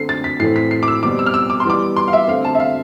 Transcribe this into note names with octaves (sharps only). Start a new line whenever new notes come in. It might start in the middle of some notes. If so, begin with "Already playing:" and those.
Already playing: D3 A3 C4 C7
A6
B6
A2 E3 A3 C4 C7
B6
C7
D6
E6
B2 G3 C4 D6
E6
F6
E6
D6
C6
E3 G3 B3 D6
C6
F5
E5
D3 A3 C4 F5
A5
E5
F5